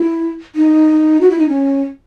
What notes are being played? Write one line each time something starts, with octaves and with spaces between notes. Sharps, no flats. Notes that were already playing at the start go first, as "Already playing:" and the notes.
Already playing: E4
D#4
F#4
E4
D#4
C#4